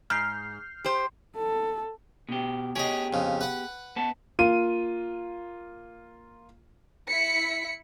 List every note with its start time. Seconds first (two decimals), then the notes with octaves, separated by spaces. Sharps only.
0.10 G#2 F6 G6 C7
0.84 G4 C5
1.36 A4
2.29 B2 G4
2.76 B3 G4 G#4 C#5 D#5
3.13 F2 C#3
3.41 B4 F#5
3.96 B3 A5
4.39 A#3 F4 D#7
7.08 E4 B6 C#7